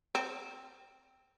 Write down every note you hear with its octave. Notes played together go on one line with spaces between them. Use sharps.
C4